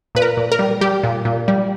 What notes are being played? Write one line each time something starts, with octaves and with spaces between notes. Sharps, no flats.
A#2 B4
A#4
A#2
A#4
G3
G3 G4
A#2
A#2
G3